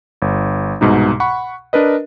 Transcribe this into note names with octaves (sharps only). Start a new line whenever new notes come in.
G1
C2 G#2 B2 D#4
F#5 B5 C#6
D4 A#4 B4 D#5